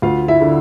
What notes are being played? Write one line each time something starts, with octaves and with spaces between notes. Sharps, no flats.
D2 F4 F5
E4 E5
D3